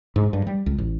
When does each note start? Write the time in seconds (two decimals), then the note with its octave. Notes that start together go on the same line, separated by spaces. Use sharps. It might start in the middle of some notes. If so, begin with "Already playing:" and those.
0.16 G#2
0.33 G2
0.47 G3
0.66 C#2
0.78 A1